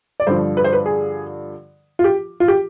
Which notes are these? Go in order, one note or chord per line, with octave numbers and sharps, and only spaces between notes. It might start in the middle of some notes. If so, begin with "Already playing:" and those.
D5
G2 D3 F3 C5
B4
C5
B4
G#4
F4
G4
F4
G4